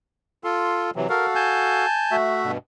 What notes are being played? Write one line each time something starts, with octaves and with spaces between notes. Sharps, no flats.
F4 A4 C6
C3 E3 F#3
F#4 A4 A#4 F5
G#5 A5 G6
A3 F#4 E5
G2 B2